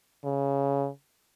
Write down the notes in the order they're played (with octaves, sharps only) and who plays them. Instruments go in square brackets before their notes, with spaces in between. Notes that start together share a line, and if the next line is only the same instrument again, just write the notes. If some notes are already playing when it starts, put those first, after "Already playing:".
[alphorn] C#3